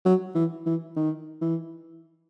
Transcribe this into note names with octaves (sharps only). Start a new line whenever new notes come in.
F#3
E3
E3
D#3
E3